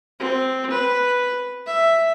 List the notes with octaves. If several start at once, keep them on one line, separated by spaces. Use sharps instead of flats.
C4
B4
E5